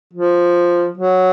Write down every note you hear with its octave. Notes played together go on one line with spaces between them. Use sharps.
F3
F#3